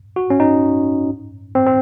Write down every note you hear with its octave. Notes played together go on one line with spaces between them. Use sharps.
F#4
C#4
D#4
C4
C4